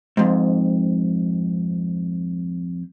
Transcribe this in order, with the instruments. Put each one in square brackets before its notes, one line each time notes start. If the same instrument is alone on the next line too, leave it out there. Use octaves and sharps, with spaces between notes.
[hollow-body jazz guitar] F2 G#2